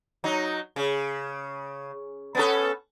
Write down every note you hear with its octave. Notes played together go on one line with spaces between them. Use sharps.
F#3 D#4
C#3
B3 C#4 A4